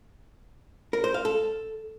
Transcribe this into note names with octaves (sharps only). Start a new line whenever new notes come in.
A#4
C5
F5
A4